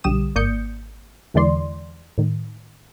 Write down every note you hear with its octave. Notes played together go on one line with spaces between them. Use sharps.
B1 D3 G3 G4 D#6 E7
G#1 A#3 D5 D#6 G6 C#7
E2 D3 E3 G#3 D5 C6
A2 D#3